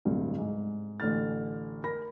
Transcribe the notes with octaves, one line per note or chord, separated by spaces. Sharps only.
D1 G2 C3
G#2
A1 D3 F6 A6
A#4 B5 A#6